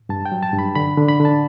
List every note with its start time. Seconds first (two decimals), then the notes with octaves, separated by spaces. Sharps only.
0.09 G2 A5
0.25 G5
0.32 F#3
0.43 A5
0.54 G2
0.59 B5
0.75 D3 B5
0.98 D3
1.08 B5
1.20 D3 A5